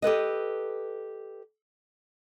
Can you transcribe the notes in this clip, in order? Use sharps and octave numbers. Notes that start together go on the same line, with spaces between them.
G4 A4 B4 D#5